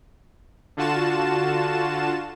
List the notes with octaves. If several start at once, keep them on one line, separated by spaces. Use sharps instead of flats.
D3 F4 F#4 A5 E7